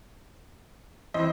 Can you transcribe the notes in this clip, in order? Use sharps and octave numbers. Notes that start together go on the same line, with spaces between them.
E3 C4 D#5